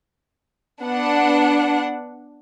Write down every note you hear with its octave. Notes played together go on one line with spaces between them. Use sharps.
B3 D4 F#5